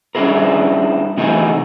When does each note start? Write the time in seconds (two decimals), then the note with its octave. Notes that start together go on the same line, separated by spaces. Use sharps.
0.15 G3 C#4 D4 E4 G#4 A#4
1.17 C3 E3 A3 D#4 F#4 G#4